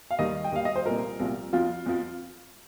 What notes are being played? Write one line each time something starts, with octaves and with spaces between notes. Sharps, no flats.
F5
D#2 D#3 G3 D#5
G5
D#2 D#3 G3 F5
D#5
C5
C2 A#2 F3 A#4
C2 A#2 F3
F2 F3 F4
F2 F3